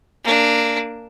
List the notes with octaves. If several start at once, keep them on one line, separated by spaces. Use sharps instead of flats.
A#3 D4